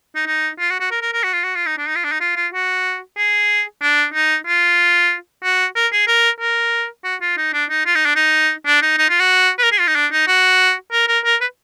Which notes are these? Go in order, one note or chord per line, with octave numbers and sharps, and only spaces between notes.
D#4
D#4
F4
F#4
F#4
A#4
A#4
A#4
F#4
F4
F#4
F4
D#4
D4
D#4
F4
D4
D#4
F4
F4
F#4
G#4
D4
D#4
F4
F#4
A#4
G#4
A#4
A#4
F#4
F4
D#4
D4
D#4
F4
D#4
D4
D#4
D4
D#4
D#4
F4
F#4
B4
A#4
G#4
F4
D#4
D4
D#4
F#4
A#4
A#4
A#4
B4